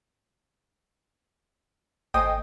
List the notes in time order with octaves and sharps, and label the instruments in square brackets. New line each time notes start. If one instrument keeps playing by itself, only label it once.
[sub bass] G#1 [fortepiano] A3 C5 G#5 [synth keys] D#5 G5 [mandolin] D#6